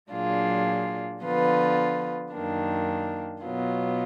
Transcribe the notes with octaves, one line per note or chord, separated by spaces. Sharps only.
A#2 F#3 D4 F4 G#4
D3 F3 B3 F4 B4
F#2 D#3 A#3 D4
B2 F#3 B3 F4